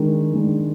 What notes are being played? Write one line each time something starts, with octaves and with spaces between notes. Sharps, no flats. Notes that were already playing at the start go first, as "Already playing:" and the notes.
Already playing: D#3 G#3 D4
D#3 G#3 D4